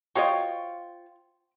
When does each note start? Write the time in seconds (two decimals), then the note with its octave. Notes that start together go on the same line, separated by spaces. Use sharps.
0.15 F4 F#4 C5 C#5 D#5 G5 C#6